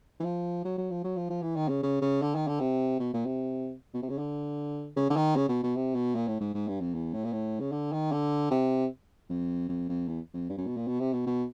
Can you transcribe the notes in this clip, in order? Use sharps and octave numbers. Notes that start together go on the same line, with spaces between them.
E3
F3
F#3
F#3
F3
F#3
F3
F3
E3
D#3
C#3
C#3
C#3
D3
D#3
D3
C3
B2
A#2
C3
B2
C3
C#3
D3
C#3
D3
D#3
C#3
B2
B2
C3
B2
A#2
A2
G#2
G#2
G2
F2
E2
A2
A#2
A2
C#3
D3
D#3
D3
C3
F2
F2
F2
E2
F2
G2
F#2
B2
A#2
B2
C3
B2
B2